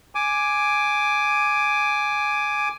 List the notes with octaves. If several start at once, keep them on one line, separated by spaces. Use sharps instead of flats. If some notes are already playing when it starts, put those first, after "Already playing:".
G#5 D6